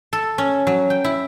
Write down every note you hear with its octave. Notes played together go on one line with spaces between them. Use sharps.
A4
C#4
F#3
G5
E4